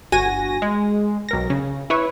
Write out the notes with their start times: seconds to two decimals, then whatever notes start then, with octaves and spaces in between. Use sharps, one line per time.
0.12 G1 F#4 G#5 A#6 D#7
0.62 G#3
1.29 B1 A#4 A#6
1.50 C#3
1.90 E4 B4 C#5